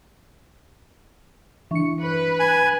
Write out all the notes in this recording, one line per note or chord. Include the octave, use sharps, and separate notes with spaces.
E3 D4 C#6 C#7
B4
G#5